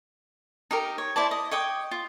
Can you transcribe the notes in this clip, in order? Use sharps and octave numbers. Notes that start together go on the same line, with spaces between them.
D#4 G4 A#4
C#5
E4 C5 D5 A5
D#5
C#5 D#5 G5 D6
F4